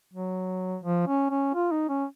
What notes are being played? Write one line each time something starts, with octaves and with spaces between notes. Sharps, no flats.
F#3
F3
C#4
C#4
F4
D#4
C#4